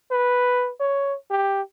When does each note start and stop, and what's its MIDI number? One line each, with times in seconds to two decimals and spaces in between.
0.11 0.71 71
0.80 1.15 73
1.31 1.62 67